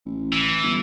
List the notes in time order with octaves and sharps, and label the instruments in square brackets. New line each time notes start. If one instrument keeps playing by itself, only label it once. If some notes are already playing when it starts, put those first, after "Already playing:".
[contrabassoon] A1
[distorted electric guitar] E3
[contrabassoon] G1